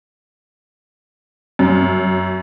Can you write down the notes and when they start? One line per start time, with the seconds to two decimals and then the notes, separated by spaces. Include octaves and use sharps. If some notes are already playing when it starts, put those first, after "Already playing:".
1.59 F#2